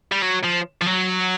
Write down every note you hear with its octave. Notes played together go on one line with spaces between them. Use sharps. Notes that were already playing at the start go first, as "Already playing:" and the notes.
G3
F#3
F3
F3
F#3